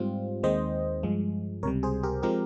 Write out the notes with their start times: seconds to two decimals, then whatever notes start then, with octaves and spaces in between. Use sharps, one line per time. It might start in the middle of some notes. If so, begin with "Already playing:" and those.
Already playing: G#2 G3 C4 F4
0.43 D#2 D#3 G#3 C4 C5 D#5
1.03 G2 F3 G#3
1.63 C#2 C3 G3 A#4 C#5
1.83 G#4 C5
2.03 G4 A#4
2.23 F3 G#3 C4 G4 A#4